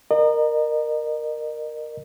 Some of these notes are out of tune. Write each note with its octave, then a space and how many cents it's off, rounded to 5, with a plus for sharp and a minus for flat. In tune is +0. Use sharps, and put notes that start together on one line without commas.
A#4 +0 D#5 -40